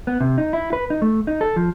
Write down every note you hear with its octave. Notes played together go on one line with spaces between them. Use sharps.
B3
C3
D#4
E4
B4
D#4
A3
D#4
A4
F3